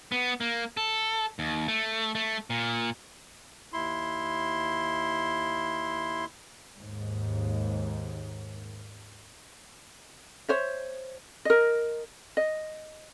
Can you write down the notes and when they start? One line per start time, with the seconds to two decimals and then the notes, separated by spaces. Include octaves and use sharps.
0.12 B3
0.41 A#3
0.77 A4
1.39 D#2
1.68 A3
2.15 A3
2.50 A#2
3.73 D#2 E4 C6
6.77 D#2 G#2
10.49 C5 C#5 E5
11.45 A#4 D#5
12.37 D#5